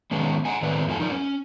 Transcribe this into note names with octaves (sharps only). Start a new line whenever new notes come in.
D3 D#3 G#3 B3 C#4 D4
D#5 F#5 G#5
A2 D#3 A3 C4 B4 D5
F2 F3 A4 G#5
D#4 A#4 D5
C#4